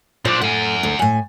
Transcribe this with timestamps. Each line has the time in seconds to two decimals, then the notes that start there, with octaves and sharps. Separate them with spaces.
0.25 A#2 D4 F4 C5
0.42 A2 F#5 G#5
0.83 D2
0.99 A2 G#5